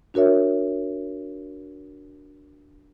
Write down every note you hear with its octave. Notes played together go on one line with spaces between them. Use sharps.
D4 F#4 A#4 C#5 E5